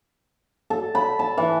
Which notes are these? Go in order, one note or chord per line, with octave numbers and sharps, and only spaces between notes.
A4
B5
A5
E3